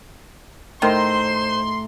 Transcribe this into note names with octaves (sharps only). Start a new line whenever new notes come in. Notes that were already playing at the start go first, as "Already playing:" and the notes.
A2 D#3 C5 A#5 C6